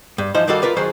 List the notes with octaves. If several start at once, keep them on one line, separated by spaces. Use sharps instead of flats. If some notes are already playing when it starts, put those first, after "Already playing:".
G2
E3 F3 D#4 C5
D#3 G3 A#3 F#4 A4
F4 A#4 B4 D5
D#3 F#3 G#4 C5